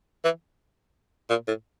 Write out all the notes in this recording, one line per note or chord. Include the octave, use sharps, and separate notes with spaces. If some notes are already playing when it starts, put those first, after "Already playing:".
E3
A#2
A2